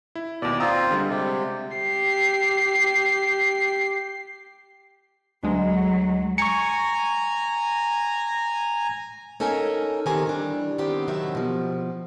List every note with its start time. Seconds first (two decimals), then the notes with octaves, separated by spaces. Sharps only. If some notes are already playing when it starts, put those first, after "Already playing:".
0.15 E4
0.42 D#2 B2 D5
0.60 C4 F4 A#5 D#6 E6
0.91 D3 G3 G#3
1.09 C3
1.76 G4 C7
5.43 D2 F#3 G#3
6.38 G#5 A#5 C#6 C#7
9.40 C#4 D#4 A4 A#4 F5 G#5
10.06 E2 D#3 C4 G4 A#4 G#5
10.25 E3 G3 D4
10.78 D#3 B3 C4 G4
11.08 C3 D#3 F#3 A4 E5
11.35 B2 F3